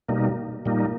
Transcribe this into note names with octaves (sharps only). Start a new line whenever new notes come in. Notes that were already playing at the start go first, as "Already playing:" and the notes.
B2 G3 A#3 D#4
A#2 G3 A#3 D#4